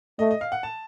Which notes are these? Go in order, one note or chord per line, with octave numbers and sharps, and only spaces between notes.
A3 D#5
D#5
F5
F#5
A5